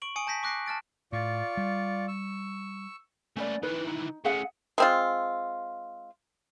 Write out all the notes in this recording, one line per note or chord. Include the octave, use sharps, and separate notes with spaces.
C#6 D7 F#7
G#5 D#6 C#7 D7
A5 G6 A#6 B6
C#6 D6 F#6 A#6 C7 D7
A5 F6 A6 D7
A2 F4 D5 C#6
G3
C#6 E6
A3 A#3 C#4 B4 D5
D#3 E3 B4
D#4
A3 C#4 G#4 E5 F#5
G#3 C4 F4